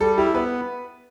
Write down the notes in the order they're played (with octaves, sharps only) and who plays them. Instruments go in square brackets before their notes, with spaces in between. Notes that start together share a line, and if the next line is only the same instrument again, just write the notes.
[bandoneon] G3 [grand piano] A4
[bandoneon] E4 [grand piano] G4
[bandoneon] B3 [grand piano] B4